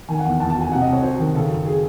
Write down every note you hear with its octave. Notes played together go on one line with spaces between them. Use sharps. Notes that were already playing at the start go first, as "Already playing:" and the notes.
D#3 G#5
F#5
E2
E2 A5
A5
F#3 G#5
C3 F#5
D#5
C2
C#5
F#3 C5
D#3
C#3 A4
F#2
G#4